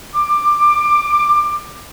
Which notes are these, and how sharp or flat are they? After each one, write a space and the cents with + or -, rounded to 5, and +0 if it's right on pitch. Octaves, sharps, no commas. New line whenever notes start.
D6 +15